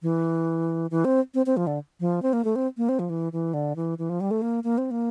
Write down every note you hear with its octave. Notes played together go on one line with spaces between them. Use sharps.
E3
E3
C4
C4
C4
F3
D3
F3
C4
A#3
A3
C4
A#3
C4
F3
E3
E3
D3
E3
E3
F3
G3
A3
A#3
A#3
C4
A#3